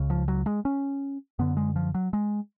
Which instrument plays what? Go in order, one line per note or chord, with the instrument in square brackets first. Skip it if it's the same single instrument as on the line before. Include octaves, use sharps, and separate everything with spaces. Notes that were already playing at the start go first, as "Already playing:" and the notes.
Already playing: [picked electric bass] C#2 C#3
F3
F#3
G#3
C#4
F#2 D3 B3
G#3
F3
F#3
G#3